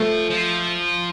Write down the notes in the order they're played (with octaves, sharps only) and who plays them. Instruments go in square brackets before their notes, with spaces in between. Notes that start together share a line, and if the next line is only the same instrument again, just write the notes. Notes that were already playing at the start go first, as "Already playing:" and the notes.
Already playing: [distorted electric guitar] F3 [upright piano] A3
[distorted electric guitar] F3